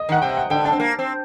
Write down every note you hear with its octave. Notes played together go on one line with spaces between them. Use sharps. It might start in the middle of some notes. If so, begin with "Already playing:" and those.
Already playing: D#5
D#3 F#5
C3 G5
F#5
D3 G5
D4 A5
C4
A#3
C4